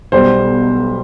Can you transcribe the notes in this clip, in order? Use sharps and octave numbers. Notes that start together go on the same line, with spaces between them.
B1 B2 G3 C5